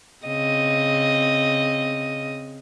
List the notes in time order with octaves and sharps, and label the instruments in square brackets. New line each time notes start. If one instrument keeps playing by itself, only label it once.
[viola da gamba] C#3 C4 D#5